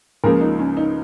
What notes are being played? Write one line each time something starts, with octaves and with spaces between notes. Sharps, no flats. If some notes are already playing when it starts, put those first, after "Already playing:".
C#2 C#3 F3 A#3 A#4
D#4
C#4
D#4